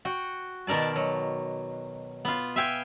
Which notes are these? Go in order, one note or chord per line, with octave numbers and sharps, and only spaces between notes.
F#4 G5
B2 D#3 A#4 D5 A5
F#3
B3 F4
E5 F5 G5 G#5